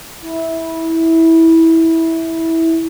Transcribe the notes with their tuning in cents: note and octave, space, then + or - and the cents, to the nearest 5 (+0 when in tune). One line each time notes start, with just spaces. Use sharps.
E4 -15